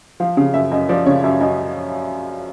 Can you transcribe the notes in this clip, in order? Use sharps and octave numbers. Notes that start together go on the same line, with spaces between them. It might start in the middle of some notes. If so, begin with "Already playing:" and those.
F3 F5
C#3 F5
F#2 E5
F#2 D#5
F3 D5
C#3 C#5
F#2 E5
F#2 D#5